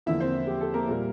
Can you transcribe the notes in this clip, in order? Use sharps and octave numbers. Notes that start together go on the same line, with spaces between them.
E2 D3 F3 A#3 E4 E5
C4 C5
G4
A4
A#3 A#4
A#2 G3 A#3